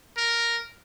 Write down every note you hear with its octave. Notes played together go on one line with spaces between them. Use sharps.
A#4